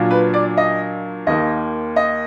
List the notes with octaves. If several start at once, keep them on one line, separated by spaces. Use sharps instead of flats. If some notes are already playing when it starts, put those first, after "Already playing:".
Already playing: A#2 F#3 D4 F4
B4
D5
D#5
D#2 D#3 A#3 D#5
D#5